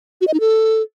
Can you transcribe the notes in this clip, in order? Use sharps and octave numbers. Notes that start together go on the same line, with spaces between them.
F#4
D#5
D#4
A4